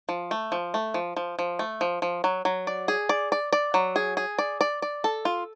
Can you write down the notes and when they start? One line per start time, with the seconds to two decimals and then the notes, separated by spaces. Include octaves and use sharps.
0.09 F3
0.31 A3
0.52 F3
0.74 A3
0.94 F3
1.17 F3
1.39 F3
1.59 A3
1.81 F3
2.02 F3
2.24 F#3
2.45 F#3
2.67 D5
2.88 G#4
3.09 D5
3.32 D5
3.53 D5
3.74 F#3
3.96 G#4
4.17 G#4
4.39 D5
4.61 D5
4.82 D5
5.04 A4
5.25 F4